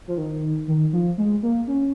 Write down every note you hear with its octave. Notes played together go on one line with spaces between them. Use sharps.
F3
D#3
D#3
F3
G#3
A#3
C#4